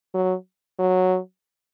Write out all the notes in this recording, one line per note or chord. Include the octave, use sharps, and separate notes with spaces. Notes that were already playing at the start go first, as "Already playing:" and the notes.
F#3
F#3